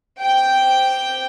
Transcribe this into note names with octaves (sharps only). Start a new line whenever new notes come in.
C4 G4 G5